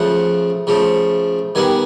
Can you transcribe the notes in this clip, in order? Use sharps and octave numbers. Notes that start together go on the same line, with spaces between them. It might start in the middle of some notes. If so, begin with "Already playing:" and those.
Already playing: C#3 F3 A3 F#5
C#3 F3 A3
D#3 G3 B3 G#5